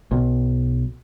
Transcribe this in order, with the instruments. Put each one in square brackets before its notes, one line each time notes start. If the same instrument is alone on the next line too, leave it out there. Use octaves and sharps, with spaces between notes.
[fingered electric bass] B1